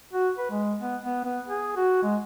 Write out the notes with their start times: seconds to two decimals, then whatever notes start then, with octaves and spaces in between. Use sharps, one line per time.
0.13 F#4
0.38 B4
0.50 G#3
0.80 B3
1.03 B3
1.25 B3
1.48 G#4
1.76 F#4
2.03 G#3